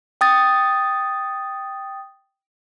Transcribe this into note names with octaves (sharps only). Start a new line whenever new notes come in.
G5 D#6 A6